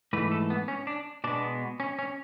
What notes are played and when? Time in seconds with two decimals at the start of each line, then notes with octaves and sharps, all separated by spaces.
0.13 G#2 E3 A3 B4
0.31 A4
0.50 B3
0.68 C#4
0.87 D4
1.24 B2 G#3 B3 D4
1.80 C#4
1.99 C#4